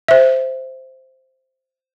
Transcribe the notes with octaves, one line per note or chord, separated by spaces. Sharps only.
C5 E5